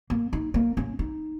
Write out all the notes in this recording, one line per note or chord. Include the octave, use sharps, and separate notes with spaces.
A#3
D#4
A#3
C#4
D#4